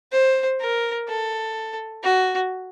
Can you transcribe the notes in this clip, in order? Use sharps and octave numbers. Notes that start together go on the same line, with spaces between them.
C5
A#4
A4
F#4